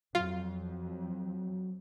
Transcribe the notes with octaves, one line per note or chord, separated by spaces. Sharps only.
F2 F#3 F4